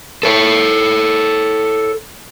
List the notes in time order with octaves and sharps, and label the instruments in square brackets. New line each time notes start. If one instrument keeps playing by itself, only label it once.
[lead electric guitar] A4 C#5